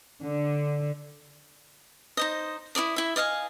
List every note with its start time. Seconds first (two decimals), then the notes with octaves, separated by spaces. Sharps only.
0.22 D3
2.17 D#4 C5 D#5
2.75 E4 A#4 D5 D#6
2.96 E4 E5
3.16 D5 D#5 F5 G#5